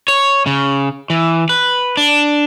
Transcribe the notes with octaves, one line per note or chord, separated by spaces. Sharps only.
C#5
C#3
E3
B4
D4